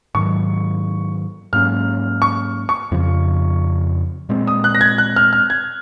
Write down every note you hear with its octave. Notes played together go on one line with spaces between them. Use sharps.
G#2 D#3 F#3 C#6
G#2 F#3 A#3 C#4 F6
C#6
C#6
F2 C#3 F3
A#2 G#3 C4
D#6
F#6
A#6
G#6
F#6
F6
F6
G#6